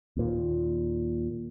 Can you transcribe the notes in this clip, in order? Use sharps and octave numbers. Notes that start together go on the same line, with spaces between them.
D#2 A#2